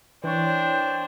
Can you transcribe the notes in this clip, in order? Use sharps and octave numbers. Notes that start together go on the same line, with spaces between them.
E3 D4 C5 C#5 G5